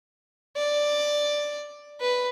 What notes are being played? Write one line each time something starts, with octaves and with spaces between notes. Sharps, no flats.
D5
B4